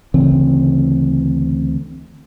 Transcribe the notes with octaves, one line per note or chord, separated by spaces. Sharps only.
D2 C#3 E3 C4